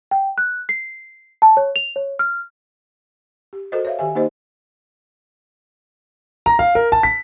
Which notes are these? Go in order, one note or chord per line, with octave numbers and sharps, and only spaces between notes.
G5
F#6
C7
A5
C#5
F7
C#5
F6
G4
F#4 A4 A#4 C5 D#5
C#5 E5 F5
D#3 G4 E5 G#5
A#3 D#4 G4 C5 D#5
A#5
F5
A#4
A5
B6